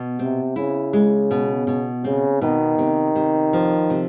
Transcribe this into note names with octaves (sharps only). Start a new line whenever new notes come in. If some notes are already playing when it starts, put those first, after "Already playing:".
Already playing: B2
C3 C4
C#3 E4
G#3
B2
B2
C#3 C4
B2 D#3
C3
C3
F3
C3